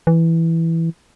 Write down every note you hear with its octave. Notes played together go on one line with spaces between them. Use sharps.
E3